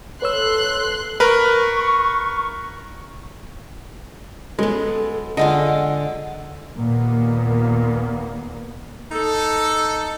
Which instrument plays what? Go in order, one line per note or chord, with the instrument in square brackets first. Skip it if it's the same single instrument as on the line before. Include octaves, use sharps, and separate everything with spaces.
[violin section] A4 C6 F#6 [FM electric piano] B4 C#5 E6
[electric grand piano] A#4 B4 [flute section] C#6
[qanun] F#3 B3 [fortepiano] G#3 [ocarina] A4
[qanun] D3 G#3 F4 [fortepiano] D#5 [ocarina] F#5
[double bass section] D#2 A#2 A#3 B3
[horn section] D#4 A4